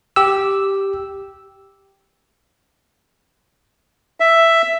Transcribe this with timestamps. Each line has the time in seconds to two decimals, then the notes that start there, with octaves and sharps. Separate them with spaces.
0.16 G4 E6
4.20 E5